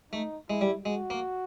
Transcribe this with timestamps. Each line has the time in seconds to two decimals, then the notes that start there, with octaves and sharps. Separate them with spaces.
0.12 A3 D#4
0.49 G#3 E4
0.61 G3
0.85 G#3 F#4
1.10 A#3